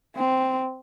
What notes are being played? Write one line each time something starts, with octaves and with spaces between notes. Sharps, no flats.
C4